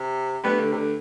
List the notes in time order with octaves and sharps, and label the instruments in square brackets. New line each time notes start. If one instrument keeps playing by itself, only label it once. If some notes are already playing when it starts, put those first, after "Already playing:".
Already playing: [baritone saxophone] C3
[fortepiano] A3 D4 G4 B4 [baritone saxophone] B3
[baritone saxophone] D3
C3
D3